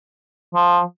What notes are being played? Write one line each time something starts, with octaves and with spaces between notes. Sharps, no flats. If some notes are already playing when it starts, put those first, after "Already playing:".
F3